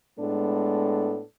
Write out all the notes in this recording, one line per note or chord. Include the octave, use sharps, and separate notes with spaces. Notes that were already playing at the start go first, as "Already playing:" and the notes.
A2 G#3 B3 D4 A4